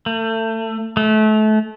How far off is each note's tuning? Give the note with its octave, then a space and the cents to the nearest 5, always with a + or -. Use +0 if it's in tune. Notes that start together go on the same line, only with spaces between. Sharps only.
A3 +30
A3 -30